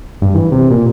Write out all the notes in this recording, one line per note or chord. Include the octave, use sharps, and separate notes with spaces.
G2
E3
C3
A#2